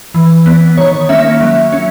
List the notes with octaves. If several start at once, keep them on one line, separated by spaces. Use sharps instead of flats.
E3
B3
D#3 C#5
A#3 C#4 E5
F#3
C#4